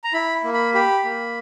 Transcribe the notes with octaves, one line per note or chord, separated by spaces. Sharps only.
A#5
E4 B5
A#3
B5
G4 B5
A#3